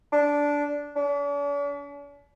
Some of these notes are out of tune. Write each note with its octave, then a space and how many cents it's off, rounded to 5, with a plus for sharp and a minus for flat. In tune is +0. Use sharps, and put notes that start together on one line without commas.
D4 -10
D4 -45